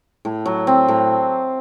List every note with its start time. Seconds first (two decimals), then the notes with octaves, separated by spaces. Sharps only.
0.25 A2
0.45 F#3
0.67 C4
0.88 A2